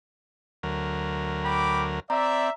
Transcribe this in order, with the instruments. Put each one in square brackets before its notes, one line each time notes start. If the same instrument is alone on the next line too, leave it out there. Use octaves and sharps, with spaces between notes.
[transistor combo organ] D2 F#3 A#4
[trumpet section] G5 B5 D6
[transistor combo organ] C4 [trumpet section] D5 E5 [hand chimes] A#5